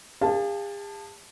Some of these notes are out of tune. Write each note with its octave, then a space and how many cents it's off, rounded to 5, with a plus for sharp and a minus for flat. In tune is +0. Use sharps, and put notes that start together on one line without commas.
G#4 -45 F5 +0 A5 +0